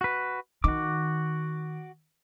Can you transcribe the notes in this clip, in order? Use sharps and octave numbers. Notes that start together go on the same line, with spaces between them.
F#4 B4
D#3 F#4 D6